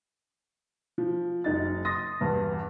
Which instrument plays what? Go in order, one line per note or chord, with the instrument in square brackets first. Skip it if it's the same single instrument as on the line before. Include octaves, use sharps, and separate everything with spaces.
[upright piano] F3
F#1 D#4 A6
C6 D#6 A6 A#6
E2 G2